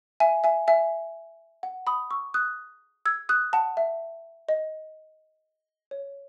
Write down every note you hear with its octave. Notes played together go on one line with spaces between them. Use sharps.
E5 G#5
E5 G#5
E5 G#5
F#5
B5 D#6
C#6 E6
D#6 F#6
E6 G#6
D#6 F#6
F#5 A5
E5
D#5
C#5